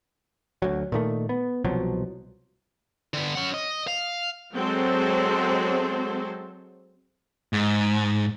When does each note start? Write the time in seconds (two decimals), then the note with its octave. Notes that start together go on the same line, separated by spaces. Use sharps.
0.62 D2 F#3
0.92 A#2 D#3 A3
1.29 B3
1.64 C2 B2 F3 F#3
3.14 D3 B3
3.35 C#4 F#5
3.54 D#5
3.87 F5
4.55 F#3 G#3 C4 A4 C5
7.53 G#2